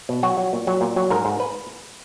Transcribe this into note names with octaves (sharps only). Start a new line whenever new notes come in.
B2
F#3 F#4
F#3
A#2
F#3
A#2
F#3
G#2 A#4
G#2
B4